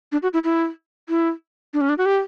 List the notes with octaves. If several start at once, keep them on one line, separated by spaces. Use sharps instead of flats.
D4
F#4
E4
E4
E4
D4
C#4
D4
F#4
G4